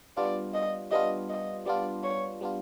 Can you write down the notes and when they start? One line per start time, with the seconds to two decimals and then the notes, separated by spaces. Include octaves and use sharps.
0.17 G3 B3 D4 F4 D5
0.54 D#5
0.91 G3 B3 D4 F4 D#5
1.29 D#5
1.66 G3 B3 D4 F4 D5
2.04 C#5
2.41 G3 B3 D4 F4